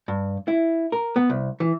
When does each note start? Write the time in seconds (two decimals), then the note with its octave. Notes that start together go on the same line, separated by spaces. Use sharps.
0.08 G2
0.48 E4
0.92 A#4
1.16 B3
1.30 C2
1.60 E3